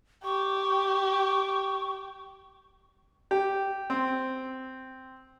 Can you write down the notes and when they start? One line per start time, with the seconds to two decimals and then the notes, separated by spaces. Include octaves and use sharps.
0.24 G4 C#6
3.31 G4
3.90 C4